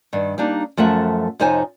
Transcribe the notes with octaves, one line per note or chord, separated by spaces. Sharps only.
G2 D#3
G3 A#3 D4 D#4
F#2 F3 A3 E5 F#5
F2 C3 D#4 C5 C#5 G#5